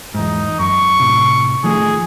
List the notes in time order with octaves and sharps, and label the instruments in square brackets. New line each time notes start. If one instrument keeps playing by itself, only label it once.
[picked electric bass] E2 G#2 [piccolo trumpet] D#4
[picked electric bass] F#2 [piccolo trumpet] C#6
[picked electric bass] A2 C3
[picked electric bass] D#3 F3 A3 [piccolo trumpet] G#4